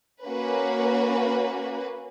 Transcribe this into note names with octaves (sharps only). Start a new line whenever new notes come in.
A#3 C#4 F#4 B4